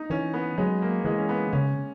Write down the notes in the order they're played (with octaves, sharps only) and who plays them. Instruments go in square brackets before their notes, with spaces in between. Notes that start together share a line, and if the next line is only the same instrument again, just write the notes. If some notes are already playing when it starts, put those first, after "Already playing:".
Already playing: [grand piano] D#4
[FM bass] E3 [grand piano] C#4
[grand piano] B3
[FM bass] F#3 [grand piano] G#3
[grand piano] A#3
[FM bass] E3 [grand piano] G#3
[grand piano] C#4
B3
[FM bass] C#3 [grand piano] C#4